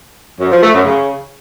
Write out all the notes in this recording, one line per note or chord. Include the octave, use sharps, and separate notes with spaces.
F#2
F3
A3
F#2
C#3